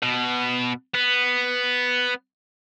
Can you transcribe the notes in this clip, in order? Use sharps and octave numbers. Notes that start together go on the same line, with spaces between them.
B2
B3